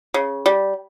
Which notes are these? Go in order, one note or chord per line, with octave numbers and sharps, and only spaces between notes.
C#3
G3